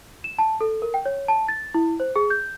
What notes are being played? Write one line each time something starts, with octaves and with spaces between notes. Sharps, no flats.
E7
A5
A4
A#4
G5
C#5
A5
A6
E4
C5
G#4
G6